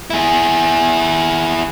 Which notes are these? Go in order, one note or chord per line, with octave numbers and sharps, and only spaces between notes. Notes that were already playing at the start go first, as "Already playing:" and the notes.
E4 G#4